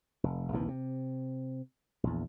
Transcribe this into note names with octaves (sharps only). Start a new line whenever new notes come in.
F1
A#1 D#2 C3 E3
C3
A#1 E2